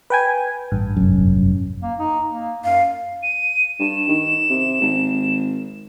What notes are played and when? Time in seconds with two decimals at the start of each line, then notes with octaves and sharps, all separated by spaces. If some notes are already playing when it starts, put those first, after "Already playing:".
0.10 B4 G5 G#5
0.72 A1 G2
0.97 F1 F#2
1.82 A#3
1.99 D#4
2.30 A#3
2.64 F#2 F5
3.23 D#7
3.80 G2 E7
4.09 D#3
4.50 C3
4.82 G#1